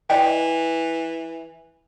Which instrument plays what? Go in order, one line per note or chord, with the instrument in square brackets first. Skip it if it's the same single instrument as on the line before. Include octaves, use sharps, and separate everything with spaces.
[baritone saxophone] E3 [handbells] D5 D#5 G5